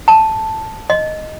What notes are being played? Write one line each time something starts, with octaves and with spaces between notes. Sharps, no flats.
A5
D#5